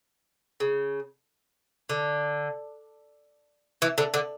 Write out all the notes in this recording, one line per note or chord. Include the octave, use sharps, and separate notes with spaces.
C#3
D3
E3
D3
D3